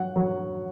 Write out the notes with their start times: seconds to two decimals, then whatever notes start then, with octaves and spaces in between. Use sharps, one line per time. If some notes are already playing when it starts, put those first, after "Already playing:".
Already playing: F#3 F#5
0.16 F#3